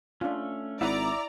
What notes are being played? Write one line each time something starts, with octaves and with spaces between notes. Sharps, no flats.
A3 C#4 D4 F4
G#1 E4 D5 E5 F#5 A#5 D6 D#6